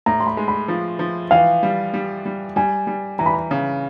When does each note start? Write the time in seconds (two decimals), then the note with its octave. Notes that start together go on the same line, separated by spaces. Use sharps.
0.06 A2 A#5
0.20 C6
0.27 B5
0.37 G#3
0.48 B5
0.68 F3
0.99 F3
1.31 E3 F5
1.63 G3
1.94 G3
2.26 G3
2.56 G3 G#5
2.87 G3
3.19 E3 A#5
3.26 B5
3.34 A#5
3.51 C#3